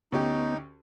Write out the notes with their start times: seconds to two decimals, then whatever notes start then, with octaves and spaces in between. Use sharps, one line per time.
0.12 D2 B3 C#4 D#4 G4